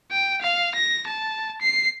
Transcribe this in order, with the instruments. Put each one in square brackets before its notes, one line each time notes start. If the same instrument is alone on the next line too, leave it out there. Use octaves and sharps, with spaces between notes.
[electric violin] G5
F5
A#6
A5
C7